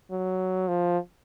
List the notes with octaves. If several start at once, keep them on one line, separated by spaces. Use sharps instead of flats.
F#3
F3